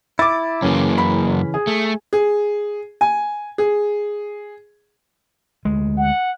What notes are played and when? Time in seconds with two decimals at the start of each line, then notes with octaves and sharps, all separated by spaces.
0.19 E4 D6 A6
0.63 F#2 C#3 E3 A#3 C#4
0.98 B5
1.54 G#4
1.67 A3
2.13 G#4
3.01 G#5
3.58 G#4
5.65 D2 G#3
5.97 F#5